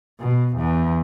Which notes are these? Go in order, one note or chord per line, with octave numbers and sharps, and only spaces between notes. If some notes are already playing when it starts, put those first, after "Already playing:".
B2
E2